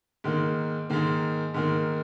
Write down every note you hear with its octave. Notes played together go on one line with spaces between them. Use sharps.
G#2 D#3 A#3
G#2 D#3 A#3
G#2 D#3 A#3